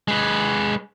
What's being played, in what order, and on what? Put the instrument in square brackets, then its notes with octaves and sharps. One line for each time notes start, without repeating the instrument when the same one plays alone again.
[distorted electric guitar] G#3 B4